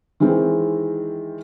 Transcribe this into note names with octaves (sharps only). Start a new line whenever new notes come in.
D#3 E3 G#3 C4